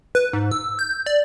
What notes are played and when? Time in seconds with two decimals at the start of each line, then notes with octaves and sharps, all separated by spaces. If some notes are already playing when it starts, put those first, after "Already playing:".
0.15 B4
0.33 G#2
0.52 E6
0.79 G6
1.06 D5